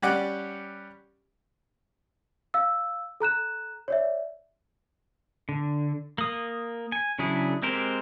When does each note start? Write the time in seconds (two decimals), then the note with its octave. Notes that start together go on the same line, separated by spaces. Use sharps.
0.02 G3 C#4 G4 D5 F#5 D6
2.54 F5 E6
3.20 A4 A#5 F#6 E7
3.88 C#5 D5 E5
5.49 D3
6.18 A#3 D#6
6.92 G#5
7.19 C#3 F#3 D4 E4 G#4
7.62 G#3 C4 G4 A#4 C5